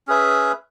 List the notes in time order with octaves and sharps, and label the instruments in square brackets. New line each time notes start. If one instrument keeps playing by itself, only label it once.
[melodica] C#4 G#4 B4 E5